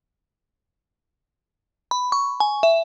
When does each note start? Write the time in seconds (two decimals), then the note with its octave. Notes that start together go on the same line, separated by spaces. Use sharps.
1.91 B5
2.12 C#6
2.40 G#5
2.63 E5